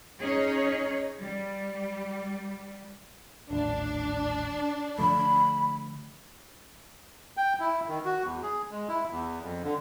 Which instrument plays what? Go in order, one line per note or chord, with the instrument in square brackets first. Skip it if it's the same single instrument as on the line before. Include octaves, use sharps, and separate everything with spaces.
[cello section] C#4 D#4 G#4 C#5
G3
[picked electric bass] D#1 A1 [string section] D4
[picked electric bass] D3 F3 A3 [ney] B5
[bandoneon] G5
E4
D#3
F#4
E2
G#4
G#3
E4
E2
F2
D3